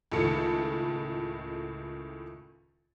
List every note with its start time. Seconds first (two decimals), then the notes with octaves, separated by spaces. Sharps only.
0.12 C#2 A2 D#3 A4 C#7